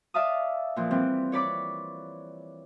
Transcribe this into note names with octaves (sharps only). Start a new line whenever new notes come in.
D5 E5 F5 A5 D#6
A#2 E3 F3
E3 G3 C4
C#5 D5 B5 D6